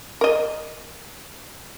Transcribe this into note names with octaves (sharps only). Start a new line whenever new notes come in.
A#4 D#5